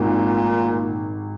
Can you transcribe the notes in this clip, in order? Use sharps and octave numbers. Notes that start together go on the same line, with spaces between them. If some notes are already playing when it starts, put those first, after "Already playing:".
Already playing: G#1 A#2